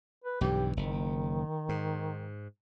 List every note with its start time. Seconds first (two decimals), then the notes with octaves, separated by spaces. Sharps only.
0.24 B4
0.41 B1 G2 E3 G4
0.77 F#1 D#3
1.69 G#2